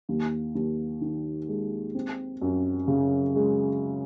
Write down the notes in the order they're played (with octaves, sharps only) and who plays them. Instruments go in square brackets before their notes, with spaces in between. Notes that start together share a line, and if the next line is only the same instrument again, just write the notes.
[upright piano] D#2
D#2
D#3
G#3
C4
F#2
C#3
G#3